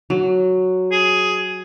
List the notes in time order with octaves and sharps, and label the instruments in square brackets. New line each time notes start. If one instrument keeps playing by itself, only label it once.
[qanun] F#3
[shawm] G#4